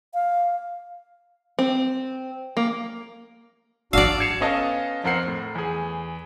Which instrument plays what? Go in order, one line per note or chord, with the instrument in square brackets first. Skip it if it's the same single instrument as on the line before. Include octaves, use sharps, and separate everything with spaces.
[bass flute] F5
[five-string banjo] C4
A#3
[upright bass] G#1 E3 [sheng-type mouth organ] D4 F#4 E6 [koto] D5 F5
[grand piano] G#6 C7 C#7 E7 F7
B3 C#4 A4 D#5 F5 A5
F2 C4 A#4 F#5 C7
A2
E2 G#4